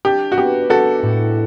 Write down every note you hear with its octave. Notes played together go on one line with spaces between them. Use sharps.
D4 G4
F#4
B3 G4
D4 F#4 A4
A2